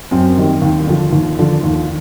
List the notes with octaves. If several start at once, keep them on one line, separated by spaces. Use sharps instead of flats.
F#2 C4
D#3 G3
D#2
D3 F3
D#2
D3 F3
D#2